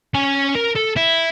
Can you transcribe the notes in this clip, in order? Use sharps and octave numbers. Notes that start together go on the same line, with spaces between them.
C#4 G#5
A#4
A4
E4